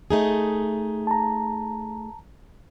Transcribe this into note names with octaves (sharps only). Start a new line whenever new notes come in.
A3 D#4 G#4
A5 A#5